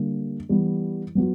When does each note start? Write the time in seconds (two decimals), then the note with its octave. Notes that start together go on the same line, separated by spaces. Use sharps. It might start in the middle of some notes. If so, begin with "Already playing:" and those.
Already playing: D3 G3 A#3
0.49 E3 G3 B3
1.15 F#3 B3 F#4